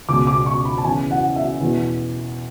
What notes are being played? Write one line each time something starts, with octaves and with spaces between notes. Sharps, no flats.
C#2 B2 D6
D6
C#6
B5
A5
E2 C#3 E3 G#5
F#5
E5
E2 B2